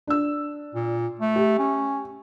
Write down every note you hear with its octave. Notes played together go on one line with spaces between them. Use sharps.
D4 E6
A#2
A3
G4
C#4